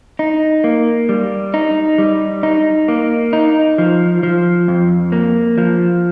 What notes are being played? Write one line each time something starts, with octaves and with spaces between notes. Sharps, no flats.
D#4
A#3
G3
D#4
G3
D#4
A#3
D#4
F3
F3
F2
A#3
F3